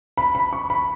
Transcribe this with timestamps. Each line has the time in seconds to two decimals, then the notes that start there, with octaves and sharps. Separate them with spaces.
0.17 B5
0.35 B5
0.53 C#6
0.70 B5